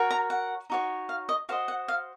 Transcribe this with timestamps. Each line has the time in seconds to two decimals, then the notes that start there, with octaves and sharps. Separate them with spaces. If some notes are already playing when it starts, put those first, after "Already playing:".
Already playing: F#4 A#4 C#5
0.11 A#5
0.30 F#5
0.70 D#4 F#4 C#5
1.09 F5
1.29 D#5
1.49 F#4 C5 D#5 F5
1.68 F#5
1.88 F5